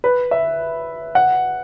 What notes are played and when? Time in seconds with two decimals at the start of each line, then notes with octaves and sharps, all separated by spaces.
0.04 B4
0.31 E5
1.15 F#5